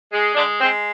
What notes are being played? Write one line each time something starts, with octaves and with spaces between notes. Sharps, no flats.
G#3
D3 G#3 D4
G#3 C4